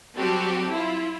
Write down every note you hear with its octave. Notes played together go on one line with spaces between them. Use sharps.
F#3 G3 C4 F#4 G4 A4
E4 F4